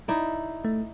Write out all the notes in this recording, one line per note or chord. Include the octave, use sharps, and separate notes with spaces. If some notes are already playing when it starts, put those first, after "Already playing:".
D#4 E4 D5
A3